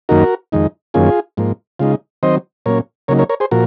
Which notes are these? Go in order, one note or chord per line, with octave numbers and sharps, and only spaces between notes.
F#2 D#3 A#3 D#4 F#4 A#4
F2 D#3 G#3 D#4
F#2 D#3 A#3 C#4 F4 G#4
G#2 F3 A#3
C#3 G#3 D#4 F4
D#3 F#3 C4 C5 D#5
A#2 F#3 A#3 C#4 A#4 C#5
C#3 F#3 A#3 D#4 A#4 C#5
A#4 C#5
A#4 C#5
G#4 C5
A#2 F3 F#4 A#4